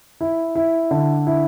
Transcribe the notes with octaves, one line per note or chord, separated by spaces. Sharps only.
E4
E4
D3
E4